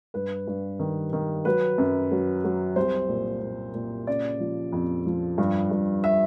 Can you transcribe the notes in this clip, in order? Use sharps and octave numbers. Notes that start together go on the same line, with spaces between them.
G2 B4
G2
D#3
D#3
F#3 B4
F#2
F#3
F#3
C2 C5
A#2
A#2
A#2
C#3 D5
F3
F2
F3
G2
G2
E5